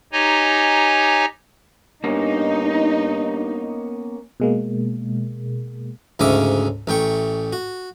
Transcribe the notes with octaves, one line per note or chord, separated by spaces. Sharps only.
D#4 G4 C#5 D#5 G#5 A#5
G2 A#3 B3 C#4 D#4
B2 G#3 A#3
D2 G#2 C#3 C#4 E5 D6
A1 A3 G5 C#6
F#4